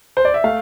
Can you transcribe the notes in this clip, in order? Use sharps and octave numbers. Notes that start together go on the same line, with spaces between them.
C5
D5
E5
A3 F5